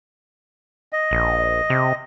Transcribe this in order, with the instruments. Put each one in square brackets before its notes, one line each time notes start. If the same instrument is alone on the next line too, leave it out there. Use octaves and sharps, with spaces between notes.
[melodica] D#5
[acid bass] A#1
C3